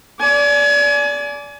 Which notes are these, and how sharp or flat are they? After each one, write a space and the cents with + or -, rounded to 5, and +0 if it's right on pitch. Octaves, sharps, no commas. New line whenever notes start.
D5 -20 G#5 +30